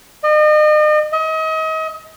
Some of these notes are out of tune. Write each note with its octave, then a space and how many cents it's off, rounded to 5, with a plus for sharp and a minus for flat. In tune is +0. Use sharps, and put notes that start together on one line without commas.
D#5 -40
D#5 +35